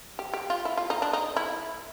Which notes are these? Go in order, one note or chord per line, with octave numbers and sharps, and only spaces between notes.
G4
G4
F4
E4
F4
D#4
D4
D#4
E4